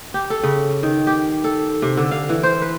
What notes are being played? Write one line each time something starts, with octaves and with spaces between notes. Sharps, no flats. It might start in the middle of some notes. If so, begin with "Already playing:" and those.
G4
A4
C#3
D#3
G4
A4
C3
D3
F5
E3
C5
B4